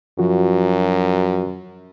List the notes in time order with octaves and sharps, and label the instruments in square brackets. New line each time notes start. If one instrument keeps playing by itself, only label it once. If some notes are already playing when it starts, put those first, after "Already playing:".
[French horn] F#2 [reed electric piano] F3 F4 F#4